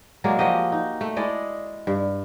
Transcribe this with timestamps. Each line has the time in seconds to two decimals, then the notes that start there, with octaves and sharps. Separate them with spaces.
0.24 F#3 G#3 A#3 D5
0.39 F3 F#4 G4 D#5
0.72 D#4
1.01 A3
1.16 G#3 E4 D5 D#5
1.87 G2